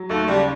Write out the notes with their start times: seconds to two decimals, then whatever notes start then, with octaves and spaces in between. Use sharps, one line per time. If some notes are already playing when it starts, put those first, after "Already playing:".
Already playing: F#3
0.09 D#2 A3
0.28 C#3 G3